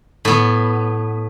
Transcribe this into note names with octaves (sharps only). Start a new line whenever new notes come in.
A2 B3